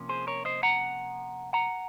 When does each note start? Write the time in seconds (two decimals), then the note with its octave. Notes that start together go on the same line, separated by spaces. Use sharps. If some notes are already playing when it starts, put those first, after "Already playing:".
Already playing: C3 F3 A#3 C#4
0.09 G#4 C5
0.27 A#4 C#5
0.45 C5 D#5
0.63 F#5 A#5
1.53 F#5 A#5